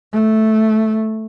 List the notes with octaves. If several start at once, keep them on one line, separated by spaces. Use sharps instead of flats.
A3